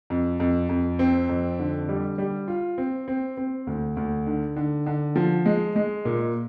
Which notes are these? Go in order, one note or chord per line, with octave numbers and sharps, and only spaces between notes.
F2
F2
F2
C4
F2
D3
G3
G3
F4
C4
C4
C4
D2
D2
D3
D3
D3
F3
G#3
G#3
A#2